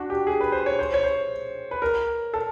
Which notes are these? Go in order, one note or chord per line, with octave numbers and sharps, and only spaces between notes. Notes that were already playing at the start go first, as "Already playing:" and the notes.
Already playing: D4 F#4
G4
G#4
B4
C5
C#5
C5
C#5
C5
B4
A#4
A4